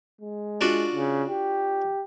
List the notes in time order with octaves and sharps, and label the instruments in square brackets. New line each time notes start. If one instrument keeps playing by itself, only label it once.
[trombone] G#3
[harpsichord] D4 F4 F#4
[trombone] C#3
G4